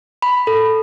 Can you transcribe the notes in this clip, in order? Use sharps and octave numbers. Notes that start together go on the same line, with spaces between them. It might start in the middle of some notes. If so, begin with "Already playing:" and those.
B5
A4